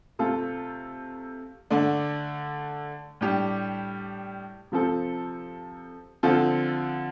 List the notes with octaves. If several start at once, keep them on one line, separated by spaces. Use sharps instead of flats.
C3 A3 F4 A4
D3 A3 D4
A2 G3 D4 G4
C3 F3 C4 A4
D3 F3 C4 F4 A4